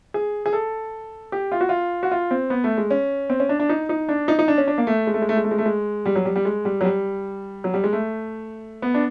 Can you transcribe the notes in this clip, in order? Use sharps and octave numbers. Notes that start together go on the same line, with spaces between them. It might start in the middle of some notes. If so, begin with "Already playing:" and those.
G#4
G#4
A4
G4
F4
F#4
F4
F#4
F4
C4
B3
A3
G#3
C#4
C4
C#4
D4
D4
D#4
D#4
D4
D#4
D#4
D4
C#4
D4
A#3
A3
G#3
A3
G#3
A3
G#3
A3
G#3
A3
G#3
G3
F#3
G3
G3
G#3
G3
F#3
G3
F#3
G3
G#3
A3
B3
D4